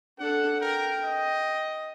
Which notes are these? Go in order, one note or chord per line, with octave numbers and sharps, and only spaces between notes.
D4 A4 F#5
A#4 G5
D#5